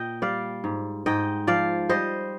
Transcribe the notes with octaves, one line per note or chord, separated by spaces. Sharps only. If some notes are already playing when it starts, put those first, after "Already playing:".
Already playing: A#2 D#5 G5
G3 D5 F5
G#2
G#2 D#5 G5
F3 D5 F5
G3 C5 D#5